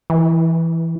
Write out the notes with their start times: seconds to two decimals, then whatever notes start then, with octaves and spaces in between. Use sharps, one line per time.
0.10 E3